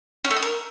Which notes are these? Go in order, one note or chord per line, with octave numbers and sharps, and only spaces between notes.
C#4
A3
D#5
A#4